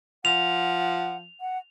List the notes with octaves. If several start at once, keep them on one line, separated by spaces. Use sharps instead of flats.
F3 F#5 F7
F#5